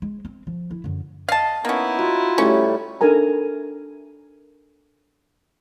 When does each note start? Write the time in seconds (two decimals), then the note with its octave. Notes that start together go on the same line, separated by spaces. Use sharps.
0.02 G#3
0.25 C4
0.47 F3
0.71 E4
0.84 F#2 D3
1.29 D#5 F5 A5
1.65 A#3 B3 C#4 D#4 E4
1.99 F4 F#4
2.38 A2 G3 C#4
3.01 D4 D#4 A4 A#4 G#5 A#5